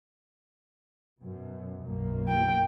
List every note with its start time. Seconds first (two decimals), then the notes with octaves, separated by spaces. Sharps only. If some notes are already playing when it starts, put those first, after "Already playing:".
1.21 F#2 B2
1.84 B1 F#2 A#3
2.29 G5